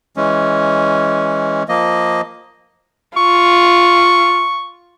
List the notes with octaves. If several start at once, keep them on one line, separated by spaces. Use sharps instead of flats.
E3 G#3 C#4
F3 A#3 D#5
F4 C#6